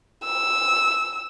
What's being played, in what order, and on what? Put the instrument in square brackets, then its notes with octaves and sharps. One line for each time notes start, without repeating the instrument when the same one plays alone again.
[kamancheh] E6